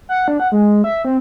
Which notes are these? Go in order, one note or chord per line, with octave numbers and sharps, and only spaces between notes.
F#5
D4
F#5
G#3
E5
C4